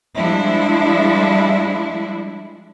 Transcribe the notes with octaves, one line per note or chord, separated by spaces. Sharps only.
F3 G3 G#3 D4 E4